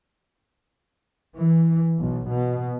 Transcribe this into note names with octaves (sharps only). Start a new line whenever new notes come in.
E3
B1
B2